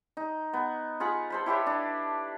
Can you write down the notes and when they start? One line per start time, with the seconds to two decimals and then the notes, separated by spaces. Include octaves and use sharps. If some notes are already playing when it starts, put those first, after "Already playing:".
0.17 D#4
0.53 B3
1.00 F4 G#4 F#5 B5
1.30 A4 C5 B5
1.46 E4 G4 B4 C#5
1.67 D4